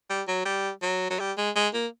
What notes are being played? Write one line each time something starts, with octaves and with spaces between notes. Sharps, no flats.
G3
F#3
G3
F#3
F#3
G3
G#3
G#3
A#3